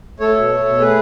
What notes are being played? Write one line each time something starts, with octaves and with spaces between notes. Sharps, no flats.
A3 A4 C#5
B2
A3
B2
A3 G#4 B4